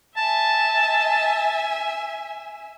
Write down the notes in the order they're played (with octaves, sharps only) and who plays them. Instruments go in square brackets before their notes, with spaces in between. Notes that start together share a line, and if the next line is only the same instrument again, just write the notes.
[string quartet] E5 G#5 [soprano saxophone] A5